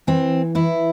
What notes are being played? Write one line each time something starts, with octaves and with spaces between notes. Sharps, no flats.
E3 C4
E3 E4